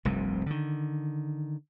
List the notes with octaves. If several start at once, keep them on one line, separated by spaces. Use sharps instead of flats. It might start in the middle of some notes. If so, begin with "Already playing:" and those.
F1 C2 G2 C3
D3 D#3